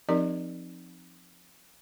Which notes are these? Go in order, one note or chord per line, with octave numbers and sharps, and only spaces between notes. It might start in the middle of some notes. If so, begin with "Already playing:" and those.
F3 C4 D#4 G4 A#4 D5